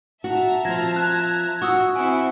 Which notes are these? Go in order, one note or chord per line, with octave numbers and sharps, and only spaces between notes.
F#4 E5 A5 A#5
F3 C4 G#6 A#6
F#6
F#4 F#5 C#6 D#6 E6
C4 E4 F#5 G#5